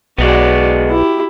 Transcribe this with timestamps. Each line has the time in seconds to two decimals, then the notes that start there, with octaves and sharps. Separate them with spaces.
0.18 B1 G#3 B3 F#4 D5
0.90 E4 G4